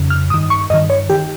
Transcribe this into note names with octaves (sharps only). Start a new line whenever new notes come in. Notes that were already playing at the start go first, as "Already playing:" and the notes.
Already playing: F2 C#3
F6
G2 D#3 D#6
C#6
G2 D#3 D#5
C#5
D#3 G4